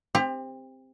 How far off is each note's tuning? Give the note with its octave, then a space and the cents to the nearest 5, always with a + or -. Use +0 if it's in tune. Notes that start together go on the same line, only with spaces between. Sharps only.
C4 +0 G4 +30